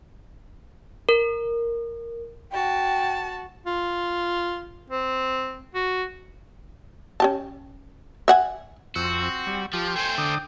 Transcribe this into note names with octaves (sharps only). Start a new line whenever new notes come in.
A#4
F#4 G5 A5
F4
C4
F#4
C#4 G4 A5
E5 F#5 G#5
F2 C4 F#4 E6
G3
F3 F4 G4
A3 C5 G5 G#5 C6
D3 D6 D#6